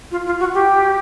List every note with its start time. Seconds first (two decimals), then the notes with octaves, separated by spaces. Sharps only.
0.11 F4
0.25 F4
0.39 F#4
0.54 G4